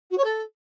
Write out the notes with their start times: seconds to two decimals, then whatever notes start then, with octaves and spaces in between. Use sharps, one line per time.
0.11 F#4
0.17 C#5
0.24 A4